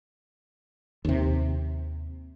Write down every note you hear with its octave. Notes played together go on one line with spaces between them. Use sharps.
D#2 C3